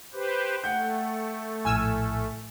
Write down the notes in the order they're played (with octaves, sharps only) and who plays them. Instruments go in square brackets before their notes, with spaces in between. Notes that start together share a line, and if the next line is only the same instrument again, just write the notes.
[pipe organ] G4 B4 C5
[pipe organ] A3 [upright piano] F#5 G5 G6
[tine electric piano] A#1 A2 F6 [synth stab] G#5 E6